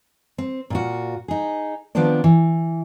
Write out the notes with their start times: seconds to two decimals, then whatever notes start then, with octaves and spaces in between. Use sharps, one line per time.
0.38 C4
0.70 A#2 F4 F#4
1.28 D#4 G#4
1.95 D#3 F3 B3 C4 D4 D5
2.24 E3